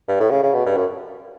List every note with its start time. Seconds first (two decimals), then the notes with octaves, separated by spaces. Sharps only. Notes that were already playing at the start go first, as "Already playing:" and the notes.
0.08 G2
0.20 A2
0.30 C#3
0.43 C#3
0.53 B2
0.66 G2
0.76 F#2